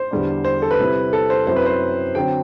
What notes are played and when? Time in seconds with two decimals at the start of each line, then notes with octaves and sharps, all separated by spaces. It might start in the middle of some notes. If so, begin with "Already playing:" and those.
Already playing: C5
0.11 E2 D3 G3 B3 D4
0.45 C5
0.62 A4
0.71 B4
0.79 C3 G3 C4 E4
1.13 A4
1.30 C5
1.47 F#2 F#3 C4 E4 C5
1.56 B4
1.66 C5
2.15 D3 F#3 C4 G5